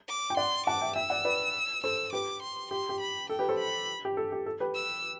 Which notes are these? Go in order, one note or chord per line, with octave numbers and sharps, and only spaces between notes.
D6
G5
D5 F#5 C6
F#5 A5 D6
E5 G5
E5 G5 E6
D5 F#5
B4 D5
A4 C5 E6
G4 B4 D6
C6
G4 C6
G4
B5
A4 G5
G4 B4
A4 C5
B5
G4
A4
G4
A4
G4 B4
E6